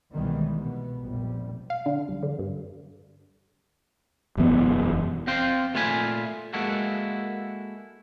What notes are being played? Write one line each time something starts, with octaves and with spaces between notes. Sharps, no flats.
C2 B2 D#3 E3 G3 G#3
B2 B3
F1 A#1 G3
F5
D3
C2
D3
G2
E1 F#2 E3 B3
C4 F5 G5 C6
A#2 A3 F4 F5 G#5 B5
G#3 A#3 E4 F#4 A4